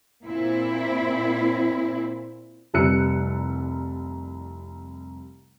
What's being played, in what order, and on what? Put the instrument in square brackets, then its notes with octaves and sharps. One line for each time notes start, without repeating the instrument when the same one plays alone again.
[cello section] A#2 C4 E4
[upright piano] F1 C2 G3 E6 F#6 C#7